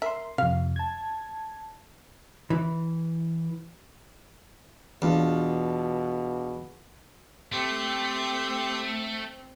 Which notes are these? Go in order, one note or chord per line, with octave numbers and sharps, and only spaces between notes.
A#4 E5 C6
F2 C3 F5
A5 G#6
E3
E2 B2 D4 F4
A3 C4 G4 C6 G6